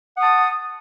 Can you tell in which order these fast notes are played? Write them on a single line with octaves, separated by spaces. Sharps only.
F#5 D#6 A5